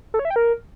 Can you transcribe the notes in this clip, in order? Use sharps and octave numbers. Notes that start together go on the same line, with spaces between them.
A4
C#5
E5
G5
A#4